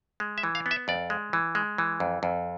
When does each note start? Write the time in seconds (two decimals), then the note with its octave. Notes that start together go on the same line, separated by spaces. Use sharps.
0.20 G#3
0.38 E5
0.43 E3
0.55 F5
0.66 B3
0.71 E5
0.88 F2 D5
1.10 G#3
1.33 E3
1.55 G#3
1.78 E3
2.00 F2
2.23 F2